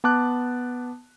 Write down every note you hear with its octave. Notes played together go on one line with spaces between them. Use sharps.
B3 A5 D6 F#6